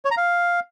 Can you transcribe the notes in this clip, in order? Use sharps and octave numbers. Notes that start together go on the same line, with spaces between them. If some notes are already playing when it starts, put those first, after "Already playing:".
C#5
A#5
F5